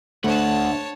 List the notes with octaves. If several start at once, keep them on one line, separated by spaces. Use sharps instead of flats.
D2 A3 C#5 F#5 A5